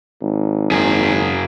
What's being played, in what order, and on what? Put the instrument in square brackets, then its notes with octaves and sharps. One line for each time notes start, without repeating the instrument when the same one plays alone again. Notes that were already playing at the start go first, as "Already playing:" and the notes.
[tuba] G#1
[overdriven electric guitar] F#2 G#4